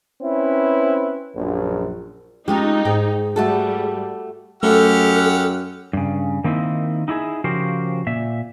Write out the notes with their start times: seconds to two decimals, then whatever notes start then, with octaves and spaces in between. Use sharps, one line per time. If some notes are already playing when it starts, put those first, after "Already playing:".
0.22 C4 C#4 E4 B4
1.36 A#1 F#2
2.48 G#3 A3 C#4 D#4 F4 G4
2.85 G#2 G#4 G5
3.36 G3 A3 F#4 A4
4.63 F#2 A3 G4 A4 F#5 F6
5.93 G2 C#3
6.44 D#3 A#3 C4 D#4 E4
7.08 D#4 E4 F#4 G#4 E5
7.44 C#3 F3 F#4 G4 A#4 C5
8.07 A#2 E5